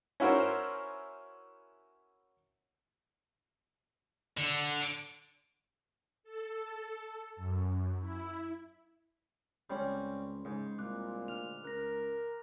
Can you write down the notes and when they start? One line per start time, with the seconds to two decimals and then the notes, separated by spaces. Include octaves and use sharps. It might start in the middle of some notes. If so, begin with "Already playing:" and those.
0.20 C#4 E4 F#4 A#4 C5
4.37 D3
6.23 A4
7.36 F#2
8.00 E4
9.70 C#2 G3 C4 C#4 B5 C6
10.45 G#2 C#3
10.78 C2 A#2 D6 F#6
11.28 D2 F6 F7
11.64 C#2 A#4 F#6 A#6